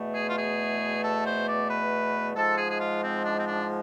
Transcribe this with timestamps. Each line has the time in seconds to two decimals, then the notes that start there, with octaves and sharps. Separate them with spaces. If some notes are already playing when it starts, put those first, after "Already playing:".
Already playing: E2 B2 A3
0.15 G#4
0.30 F4
0.38 G#4
1.04 A4
1.26 C5
1.48 D5
1.71 B4
2.36 G#2 F3 G#3 A4
2.58 G#4
2.71 G#4
2.80 F4
3.03 C4
3.24 D4
3.39 C4
3.47 D4